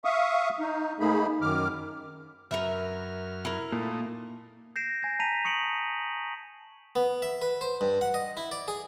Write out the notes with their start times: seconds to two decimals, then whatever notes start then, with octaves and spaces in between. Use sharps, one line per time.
0.05 E5 F5 C#6 D#6
0.60 D#4
1.00 G#2 A3 A#3 D#4 G#4 B5
1.41 F#2 D#3 D6 F6
2.51 F#2 A#4 B4 E5 F6
3.45 E4 A#4
3.72 A#2 A3 D#4
4.76 G6 A#6 C7 D7 E7
5.03 G#5 G#6 A#6
5.19 A5 A#5 B6 D#7 F7
5.45 C#6 D#6 C#7 D7 F#7
6.96 B3
7.22 E5
7.42 B4
7.61 C5
7.81 G2
8.01 F#5
8.14 D#5
8.37 E4
8.51 D5
8.68 G#4